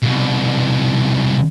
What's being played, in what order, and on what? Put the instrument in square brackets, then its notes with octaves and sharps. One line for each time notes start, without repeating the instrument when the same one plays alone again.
[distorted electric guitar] C2 B2